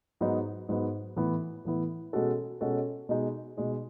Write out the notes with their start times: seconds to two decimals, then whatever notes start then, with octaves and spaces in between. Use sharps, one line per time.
0.21 G#2 F#3 B3 D#4
0.69 G#2 F#3 B3 D#4
1.16 A2 E3 B3 E4
1.65 A2 E3 B3 E4
2.13 B2 G#3 C#4 F#4 A4
2.61 B2 G#3 C#4 F#4 A4
3.09 B2 G#3 D#4
3.57 B2 G#3 D#4